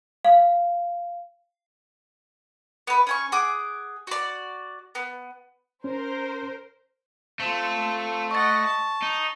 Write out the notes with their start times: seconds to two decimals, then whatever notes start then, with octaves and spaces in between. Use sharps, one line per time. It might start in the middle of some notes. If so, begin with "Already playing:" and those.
0.25 F5
2.87 B3 B4
3.07 C#4 G#5 C#6
3.32 G#4 F#5 D6
4.07 F#4 D5
4.95 B3
5.84 C#4 A#4 C5
7.39 A3 C4 F4
8.31 D#5 F#5 C#6 A6
8.65 A5
9.02 D#4